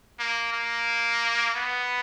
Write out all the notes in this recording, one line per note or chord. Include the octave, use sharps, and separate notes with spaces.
A#3
A#3
B3